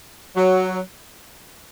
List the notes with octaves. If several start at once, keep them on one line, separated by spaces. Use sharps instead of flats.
F#3